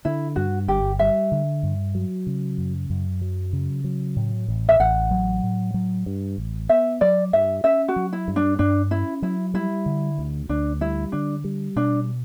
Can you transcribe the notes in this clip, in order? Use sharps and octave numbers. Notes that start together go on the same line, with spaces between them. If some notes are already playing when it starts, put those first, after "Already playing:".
D3 E4
G2 F#4
G1 G4
G3 E5
D3
G2
F#3
C#3
F#2
F#2
F#3
C#3
F#3
A2
A1
E5
A1 F#5
F#3
A2
F#3
G2
A1
B3 E5
F#3 D5
G2 E5
C#4 E5
F#4
F#3
E4
G2
D4
G2 D4
C#4 E4
F#3 E4
G3 E4
D3
D2
D2 D4
G3 E4
D3 D4
G3
B2 D4